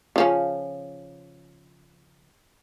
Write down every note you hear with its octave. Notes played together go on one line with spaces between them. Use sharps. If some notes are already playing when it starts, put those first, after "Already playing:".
C#3 F3 C#4